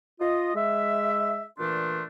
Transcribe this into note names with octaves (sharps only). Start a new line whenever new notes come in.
F4 D#5
G#3 E5
A#2 E3 A3 D4 C6